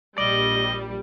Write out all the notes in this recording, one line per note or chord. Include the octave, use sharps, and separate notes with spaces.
A#1 G3 D5 D#5